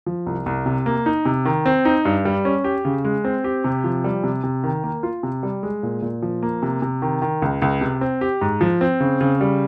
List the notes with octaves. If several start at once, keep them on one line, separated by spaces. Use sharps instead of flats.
F3
C2
C2
C3
A#3
D#4
C3
D#3
C4
D#4
G2
G3
C#4
G4
C#3
G#3
C4
G4
C3
F3
G3
C3
C3
D#3
A#3
F4
C3
G3
G#3
A#2
A#2
F3
A#3
C3
C3
D#3
D#3
C#2
C#2
C3
C4
G4
G#2
F3
C4
C#3
C#3
G3